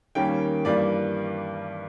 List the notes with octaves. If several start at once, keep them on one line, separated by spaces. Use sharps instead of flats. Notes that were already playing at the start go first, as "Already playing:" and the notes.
D#2 D#3 G3 A#3 C#4 G5
G2 E3 G3 A#3 D5